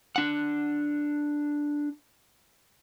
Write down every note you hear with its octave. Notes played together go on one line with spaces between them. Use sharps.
D4 F#5